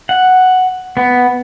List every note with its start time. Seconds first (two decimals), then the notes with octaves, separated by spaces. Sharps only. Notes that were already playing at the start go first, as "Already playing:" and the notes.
0.09 F#5
0.97 B3